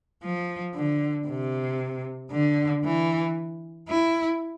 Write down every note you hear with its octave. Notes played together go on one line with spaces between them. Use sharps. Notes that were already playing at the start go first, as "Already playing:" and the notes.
F3
D3
C3
D3
E3
E4